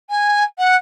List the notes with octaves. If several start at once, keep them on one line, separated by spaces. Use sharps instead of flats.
G#5
F#5